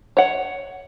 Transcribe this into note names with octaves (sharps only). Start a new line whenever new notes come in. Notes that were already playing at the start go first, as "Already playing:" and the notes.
C#5 F#5